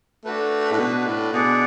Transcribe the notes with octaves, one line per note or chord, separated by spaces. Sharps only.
A3 D4 F#4 B4
A2
B2
A2
B2 D4 G#4 D5 F#5